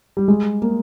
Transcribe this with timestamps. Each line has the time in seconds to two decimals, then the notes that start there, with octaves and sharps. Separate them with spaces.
0.17 G3
0.28 G#3
0.62 A#3